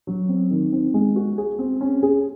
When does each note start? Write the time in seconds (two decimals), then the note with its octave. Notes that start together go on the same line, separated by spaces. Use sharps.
0.07 F#3
0.29 C4
0.51 D#3
0.72 C4
0.94 G#3
1.16 F#4
1.38 G#4
1.59 C4
1.81 C#4
2.03 G#4